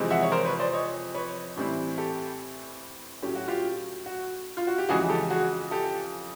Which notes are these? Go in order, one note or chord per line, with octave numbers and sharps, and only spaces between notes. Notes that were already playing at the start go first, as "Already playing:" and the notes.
Already playing: F2 C3 E3 G#3 C4
E5 F#5
C#5
A#4 C5
B4 C#5
C5 D5
C#5 D#5
B4 C#5
A2 E3 G3 C4 E4
G4 A4
A2 F#3 A3 C#4 G4
F#4
F4 G4
F#4
F4
F#4
G4
F2 C#3 E3 G#3 F#4 G#4
G4 A4
F#4 G#4
G4 A4